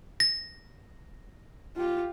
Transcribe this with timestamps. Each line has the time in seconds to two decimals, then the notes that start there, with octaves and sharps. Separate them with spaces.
0.20 A#6
1.77 F4 G4